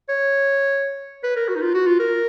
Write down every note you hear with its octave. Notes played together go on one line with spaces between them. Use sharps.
C#5
B4
A#4
F#4
D#4
F4
F#4
F4
A#4